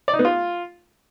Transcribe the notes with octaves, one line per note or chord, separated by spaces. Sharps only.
D5
D#4
B3
F4